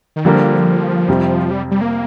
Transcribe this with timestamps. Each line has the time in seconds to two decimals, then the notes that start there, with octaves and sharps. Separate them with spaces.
0.16 D#3
0.25 D3 F3 G3 A#3
1.08 F2 C3 G3
1.51 G3
1.71 G3
1.81 A#3